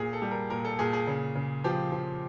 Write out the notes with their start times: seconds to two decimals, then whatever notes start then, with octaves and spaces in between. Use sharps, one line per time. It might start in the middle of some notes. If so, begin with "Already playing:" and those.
Already playing: A#2 G#4
0.13 A4
0.22 G3
0.31 A#4
0.50 A#2 A#4
0.65 A4
0.79 A#2 G#4
0.93 G#4
1.07 C#3
1.35 C#3
1.64 F3 G4
1.92 F3